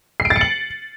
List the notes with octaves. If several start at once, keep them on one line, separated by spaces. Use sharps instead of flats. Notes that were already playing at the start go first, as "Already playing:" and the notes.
C7
D7
A6
C#7
F#7